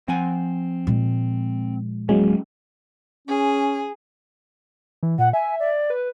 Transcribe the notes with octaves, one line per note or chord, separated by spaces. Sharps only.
F3 C4 F#5 G#5
A#2 G#3
D1 F#3 G#3 A#3 C#4
C#4 G#4
E3
A#2 F#5
E5 G#5
D5
B4